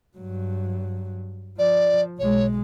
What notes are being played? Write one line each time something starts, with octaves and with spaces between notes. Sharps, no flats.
G2 F#3
F3 D5
B1 G#3 C#5